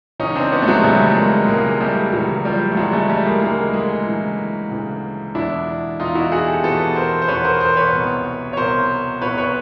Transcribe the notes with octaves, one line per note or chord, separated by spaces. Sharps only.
C#2 C#3 E3 C#4 D#4
C4 D4
B3 C#4
A3
F#3 G#3
C#2 C#3 E3 G3 A3
A3
G#3 A#3
C#2 C#3 E3 G#3 A#3
G3 A3
C#2 C#3 E3 F#3
F3 G3
A3
D2 C#3 E3 F#3 G#3
G3 A3
G3 A3
G#3 A#3
D2 C#3 E3 G#3 A#3
G#3 A#3
D2 C#3 E3
D2 C#3 E3
E2 B2 D4 E4
E2 B2 D#4 F4
E4 F#4
F#4 G#4
G4 A4
E2 B2 A4 B4
A#4 C5
C5
E2 B2 B4 C#5
A#4 C5
A#4 C5
B4 C#5
C2 B2
C#5
C2 B2 A#4 C5
C2 B2 B4 C#5
B4 C#5